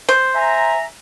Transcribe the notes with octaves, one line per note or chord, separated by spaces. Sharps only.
C5
E5 G#5 A#5